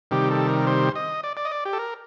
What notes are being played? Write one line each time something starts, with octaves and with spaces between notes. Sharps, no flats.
C3 D#3 G3 G4
A4
A#4
C5
D#5
D5
D5
D#5
D5
G4
A4
A#4